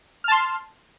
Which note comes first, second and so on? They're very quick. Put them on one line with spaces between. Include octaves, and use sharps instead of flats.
F6 A5 C6